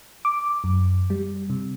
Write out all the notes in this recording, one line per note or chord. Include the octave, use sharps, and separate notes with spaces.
D6
F#2
G3
C3